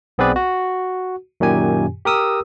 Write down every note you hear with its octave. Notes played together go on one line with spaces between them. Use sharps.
B1 B3 C4 G#4 B4 D5
F#4
F#2 A#2 D#3 G4 G#5
G4 A#4 D#6 E6